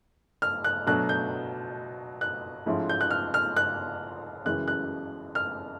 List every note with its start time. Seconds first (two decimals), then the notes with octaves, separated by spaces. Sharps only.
0.42 F6
0.64 F#6
0.87 B2 F#3 A3 D4 F#6
1.09 G6
2.21 F#6
2.66 G#2 F3 A3 C#4 E4
2.89 G6
3.01 F#6
3.11 F6
3.34 F6
3.56 F#6
4.45 F#2 C#3 E3 G#3 F#6
4.68 F#6
5.35 F6